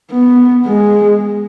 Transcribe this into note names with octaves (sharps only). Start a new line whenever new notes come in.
B3
G#3